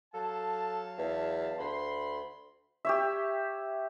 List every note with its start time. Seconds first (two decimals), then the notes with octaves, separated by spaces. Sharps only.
0.14 F#3 A4 F5 A5
0.98 E2
1.59 D2 B5 C6
2.85 G4 C#5 E5